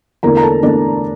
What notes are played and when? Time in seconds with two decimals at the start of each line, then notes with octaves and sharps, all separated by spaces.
0.23 E2 D3 A3 E4 A#4 A#5
0.37 A#5
0.42 A4 A5
0.63 E2 D3 A3 D4 E4 D5